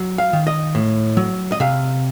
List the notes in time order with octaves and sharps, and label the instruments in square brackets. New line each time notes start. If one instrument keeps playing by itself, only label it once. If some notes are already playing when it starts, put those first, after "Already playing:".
Already playing: [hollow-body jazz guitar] F#3
F5
D#3
D#5
A2
F#3
D#5
C3 F5